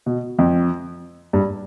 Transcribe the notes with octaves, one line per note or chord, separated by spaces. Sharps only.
B2
F2
G2